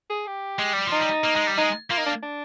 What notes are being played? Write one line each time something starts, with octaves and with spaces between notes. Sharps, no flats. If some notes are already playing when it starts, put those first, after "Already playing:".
G#4
G4
G#3
G3
F3
D#4
G3
A#3
G#3
G3
G#3 D#4
A#3 F4
D#4
D4
D4